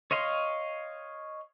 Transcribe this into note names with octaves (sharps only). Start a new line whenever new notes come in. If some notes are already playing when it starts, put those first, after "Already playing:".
C#5 D#5 F5 C6